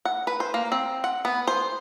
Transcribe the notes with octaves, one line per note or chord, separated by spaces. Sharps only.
F#5
B4
C5
A#3
C4
F#5
B3
C5